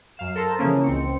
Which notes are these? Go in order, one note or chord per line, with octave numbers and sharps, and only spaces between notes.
F#2 F5 E7
A4 A#4 C5 A5 A#5 E6
C#3 E3 F3 A#3 C#4
C#2 C4 C#7